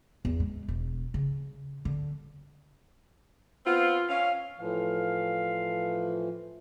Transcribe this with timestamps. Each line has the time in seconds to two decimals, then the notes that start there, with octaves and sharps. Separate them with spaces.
0.25 E2
0.40 G#3
0.68 E1
1.14 C#3
1.85 D3
3.66 B3 C4 F4
4.09 C#4 F5
4.59 A2 E3 F3 F5